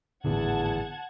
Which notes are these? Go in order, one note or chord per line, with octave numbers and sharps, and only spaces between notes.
G#1 E2 A2 D3 F#5 A5 G#6